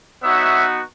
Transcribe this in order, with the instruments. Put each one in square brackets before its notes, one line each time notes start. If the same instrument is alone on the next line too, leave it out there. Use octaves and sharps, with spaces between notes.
[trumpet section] B3 D#4 F#4 C#5 E5